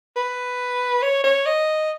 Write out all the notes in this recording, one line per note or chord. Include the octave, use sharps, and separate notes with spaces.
B4
C#5
C#5
D#5